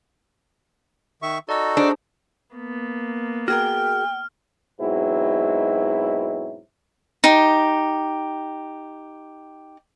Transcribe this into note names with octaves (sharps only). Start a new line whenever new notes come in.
D#3 E5 C#6
D#4 F#4 A4 D5 D#5 E6
D4 G#4 C5
A#3 B3
F#4 G#4 A#4 G5 F6
G#2 B2 F#3 C4 E4
D#4 G4